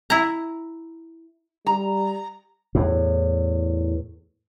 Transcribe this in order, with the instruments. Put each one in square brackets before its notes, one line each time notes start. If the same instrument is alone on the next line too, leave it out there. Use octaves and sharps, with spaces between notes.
[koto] E4 A#5
[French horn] G3 [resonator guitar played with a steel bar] A#5
[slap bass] E2 A2